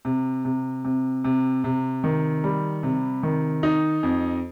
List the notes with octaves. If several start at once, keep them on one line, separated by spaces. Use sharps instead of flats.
C3
C3
C3
C3
C3
D#3
G3
C3
D#3
D#4
F2